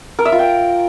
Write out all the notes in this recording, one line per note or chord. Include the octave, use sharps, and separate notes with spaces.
A#4
E5
F4
G5